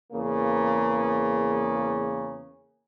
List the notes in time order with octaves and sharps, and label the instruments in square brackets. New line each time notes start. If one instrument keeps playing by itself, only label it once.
[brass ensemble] E2 C#3 A#3